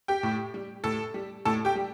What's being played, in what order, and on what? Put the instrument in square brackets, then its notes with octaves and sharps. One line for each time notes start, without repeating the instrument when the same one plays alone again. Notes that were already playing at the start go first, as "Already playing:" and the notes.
[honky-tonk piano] G4 G5
A2
G3
A2 A4 A5
G3
A2 A4 A5
G4 G5
G3